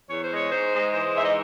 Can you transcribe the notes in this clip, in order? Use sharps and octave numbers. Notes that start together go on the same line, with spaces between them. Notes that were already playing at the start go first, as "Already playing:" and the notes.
E2 C#5
C5
G#3 C#5
G#2 C5
G#3
E3 C5
G#2 E5
D#5